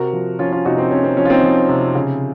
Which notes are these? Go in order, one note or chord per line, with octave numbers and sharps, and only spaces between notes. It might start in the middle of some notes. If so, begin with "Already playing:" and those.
Already playing: C3 F#4 A#4
F3
F3 C#4 F4
C#4 F4
C3 D#4 F#4
C4
C3 C#4
C4
F3 C#4
F4
C4 D#4
F3
C3
C#3